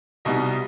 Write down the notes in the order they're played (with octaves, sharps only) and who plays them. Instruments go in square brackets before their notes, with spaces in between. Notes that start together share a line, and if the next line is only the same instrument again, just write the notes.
[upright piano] C2 B2 G3 B3 D#4 D#5